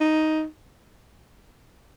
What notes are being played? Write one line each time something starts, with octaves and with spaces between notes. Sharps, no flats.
D#4